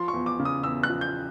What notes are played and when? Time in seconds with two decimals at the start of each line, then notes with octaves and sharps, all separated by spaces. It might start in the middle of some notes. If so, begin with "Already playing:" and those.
Already playing: F3 C6
0.08 C#6
0.13 E2
0.26 D6
0.40 C#3
0.45 D#6
0.64 E2 E6
0.83 F#6
0.89 F3
1.01 G6